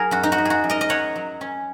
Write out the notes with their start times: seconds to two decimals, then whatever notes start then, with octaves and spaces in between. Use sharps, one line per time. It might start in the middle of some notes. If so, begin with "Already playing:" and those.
Already playing: F#3 G#4 A#4
0.11 F#2 F#4
0.23 D#4
0.32 F#4
0.38 F#2
0.45 F#4 G#4
0.64 F#2
0.70 A#4 D#5
0.81 D#5
0.89 F#3 C#5 F#5
1.15 F#3
1.41 C#4